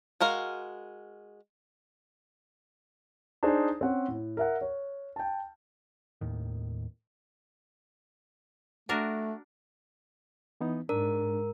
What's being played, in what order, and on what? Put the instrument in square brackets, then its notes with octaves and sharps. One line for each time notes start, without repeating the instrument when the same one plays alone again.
[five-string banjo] G#3 F#4 A#4 F5
[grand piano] D4 D#4 G#4 C5
C4 C#4 F#5
A2
A#4 E5 F#5
C#5
G5 A5
[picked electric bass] D#2 A2 D#3
[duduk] A3 [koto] D4 F#4 A#4
[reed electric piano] E3 B3 D#4
[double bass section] G#2 [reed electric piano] D4 [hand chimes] A#4